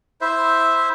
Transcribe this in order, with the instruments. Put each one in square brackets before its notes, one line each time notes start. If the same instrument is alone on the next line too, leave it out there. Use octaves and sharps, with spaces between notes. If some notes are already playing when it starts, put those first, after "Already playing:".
[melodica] E4 C5 E5